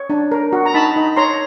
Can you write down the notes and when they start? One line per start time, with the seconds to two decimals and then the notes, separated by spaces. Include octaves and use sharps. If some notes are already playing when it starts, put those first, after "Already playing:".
Already playing: C#5
0.10 D4
0.32 A#4
0.53 F#4
0.66 A#5
0.74 D#4 A5 B5
0.96 D#4
1.17 C#5 A#5 C6